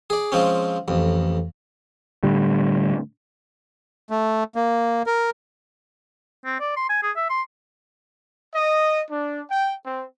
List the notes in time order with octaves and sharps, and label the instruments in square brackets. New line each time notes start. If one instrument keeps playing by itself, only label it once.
[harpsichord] G#4 D5
F3 G#3 C4 C#4
A1 F2
[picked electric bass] A2 D3 G3
[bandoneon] A3
A#3
A#4
[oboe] C4
D5
C6
G#5
G#4
E5
C6
[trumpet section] D#5
D4
G5
C4